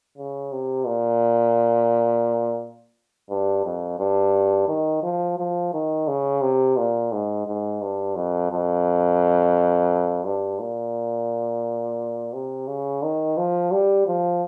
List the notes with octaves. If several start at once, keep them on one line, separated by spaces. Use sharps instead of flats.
C#3
C3
A#2
G2
F2
G2
D#3
F3
F3
D#3
C#3
C3
A#2
G#2
G#2
G2
F2
F2
G2
A#2
C3
C#3
D#3
F3
G3
F3